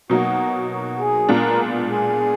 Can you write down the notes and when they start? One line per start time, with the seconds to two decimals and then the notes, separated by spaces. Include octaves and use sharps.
0.10 B2 F#3 A#3 D#4 F#4
0.70 F#4
0.99 G#4
1.29 A#2 G#3 B3 D4 F4 A#4
1.89 G#4